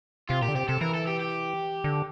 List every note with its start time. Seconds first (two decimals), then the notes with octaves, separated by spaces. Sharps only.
0.29 C3 F4
0.42 A#2 G4
0.48 D3
0.55 C3 G4
0.68 C3 A4
0.81 E3 A#4
0.94 A4
1.07 G4
1.20 G4
1.84 D3